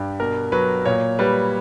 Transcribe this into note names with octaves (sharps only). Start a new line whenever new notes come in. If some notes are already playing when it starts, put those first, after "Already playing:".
Already playing: G2 G4
B2 A#4
F#3 B4
A#2 C#5
G3 B4